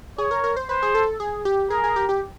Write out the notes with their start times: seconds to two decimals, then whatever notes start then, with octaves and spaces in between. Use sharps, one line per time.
0.18 G#4 C#5
0.31 A#4
0.44 A#4
0.57 C5
0.69 B4 C5
0.83 G#4
0.95 A4
1.20 G#4
1.45 G4
1.70 G#4 A#4
1.84 G#4
1.96 G4
2.09 G4